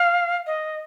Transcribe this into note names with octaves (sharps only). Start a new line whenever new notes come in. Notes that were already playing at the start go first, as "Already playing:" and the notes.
Already playing: F5
D#5